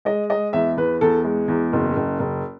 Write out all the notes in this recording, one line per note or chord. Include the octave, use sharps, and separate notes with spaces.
G#3 D#5
G#3 D#5
E2 E5
E2 B4
E2 A4
G#3
E2
F#1
F#1
F#1